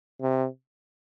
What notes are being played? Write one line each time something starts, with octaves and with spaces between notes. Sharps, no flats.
C3